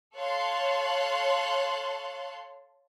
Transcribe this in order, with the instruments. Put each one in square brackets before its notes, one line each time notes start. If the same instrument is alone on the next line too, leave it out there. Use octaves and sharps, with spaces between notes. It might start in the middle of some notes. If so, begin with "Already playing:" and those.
[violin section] A4 C#5 F5 A5 C6 F#6